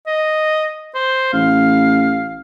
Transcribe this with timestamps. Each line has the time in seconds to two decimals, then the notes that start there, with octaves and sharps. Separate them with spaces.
0.07 D#5
0.95 C5
1.33 A1 F5